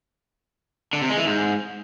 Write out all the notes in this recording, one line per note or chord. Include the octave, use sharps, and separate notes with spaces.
D3
C3
G#3
E3
G#2